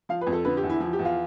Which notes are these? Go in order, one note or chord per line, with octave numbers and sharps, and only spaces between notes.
F3 F5
B4
F2
A4
D3 B4
G4
E2
E4
F3 E4
G4
E2
F4